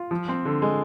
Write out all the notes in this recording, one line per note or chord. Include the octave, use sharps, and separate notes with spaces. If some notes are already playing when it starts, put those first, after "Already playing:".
Already playing: F4
F3
C4
D3
G#3